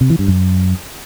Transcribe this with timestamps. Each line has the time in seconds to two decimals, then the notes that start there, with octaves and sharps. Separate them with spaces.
0.01 C3
0.10 E3
0.19 G2
0.28 F#2